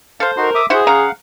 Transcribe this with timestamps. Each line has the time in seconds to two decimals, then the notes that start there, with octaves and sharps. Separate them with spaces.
0.20 A4 C5 F5
0.37 D#4 F#4 A#4 C6
0.55 E5 D6 D#6
0.70 E4 F#4 G#4 C5 F#5
0.87 C#3 F5 F#5 A#5